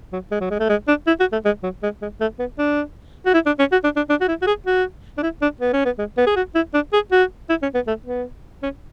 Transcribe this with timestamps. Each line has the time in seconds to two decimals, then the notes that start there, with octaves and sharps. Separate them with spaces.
0.13 F#3
0.31 G#3
0.41 F#3
0.50 G#3
0.60 A3
0.70 G#3
0.88 D4
1.07 E4
1.20 F#4
1.32 A3
1.45 G#3
1.63 F#3
1.83 G#3
2.02 G#3
2.20 A3
2.39 B3
2.58 D4
3.26 F#4
3.34 E4
3.46 D4
3.59 C#4
3.72 F#4
3.84 D4
3.96 D4
4.09 D4
4.21 F#4
4.28 E4
4.42 F#4
4.47 G#4
4.66 F#4
5.18 D4
5.23 E4
5.42 D4
5.61 B3
5.73 C#4
5.85 B3
5.99 G#3
6.18 B3
6.26 G#4
6.36 F#4
6.55 E4
6.74 D4
6.93 G#4
7.12 F#4
7.49 E4
7.63 C#4
7.75 B3
7.87 A3
8.06 B3
8.63 C#4